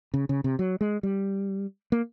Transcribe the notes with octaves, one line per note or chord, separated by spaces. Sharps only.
C#3
C#3
C3
F#3
G#3
G3
A#3